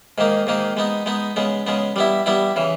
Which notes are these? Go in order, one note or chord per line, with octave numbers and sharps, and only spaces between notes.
G#2 D#3 A#3 D#4
G#2 D#3 A#3 D#4
G#3 B3 D#4
G#3 B3 D#4
C#3 G#3 B3
C#3 G#3 B3
G3 B3 E4
G3 B3 E4
C#3 E3